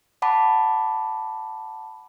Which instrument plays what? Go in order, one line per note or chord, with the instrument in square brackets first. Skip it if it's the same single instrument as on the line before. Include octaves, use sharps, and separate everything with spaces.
[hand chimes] F#5 A5 B5 D6